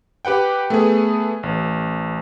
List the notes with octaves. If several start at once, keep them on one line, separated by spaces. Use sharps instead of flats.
G4 B4 F#5 G5
A3 B3 G#4
A1